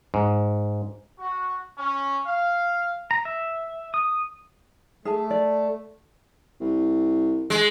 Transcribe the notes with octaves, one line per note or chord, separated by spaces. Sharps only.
G#2
F#4
C#4
F5
A#5
E5
D#6
A3 G#4 E5 A5
D5
C2
G#3